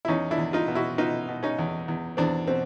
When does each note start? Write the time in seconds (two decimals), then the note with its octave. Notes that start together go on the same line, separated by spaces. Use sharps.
0.05 E4
0.08 E2 C#4 D#4
0.31 D4 E4
0.38 E2
0.53 D#4 F4
0.68 B2
0.75 E4 F#4
0.98 B2 D#4 F4
1.29 B2
1.43 C#4 D#4
1.59 E2
1.88 E2
2.17 E2 C4 D4
2.47 B2 C4